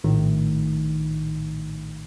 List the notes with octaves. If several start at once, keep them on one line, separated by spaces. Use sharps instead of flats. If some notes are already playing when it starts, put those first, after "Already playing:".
A#1 A2 D#3